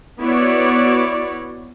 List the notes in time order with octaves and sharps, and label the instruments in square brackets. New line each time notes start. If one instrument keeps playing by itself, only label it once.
[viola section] B3 E4 F#4 C#5 D5